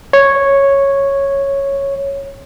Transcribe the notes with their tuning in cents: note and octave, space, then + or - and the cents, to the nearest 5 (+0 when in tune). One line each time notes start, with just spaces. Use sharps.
C#5 -5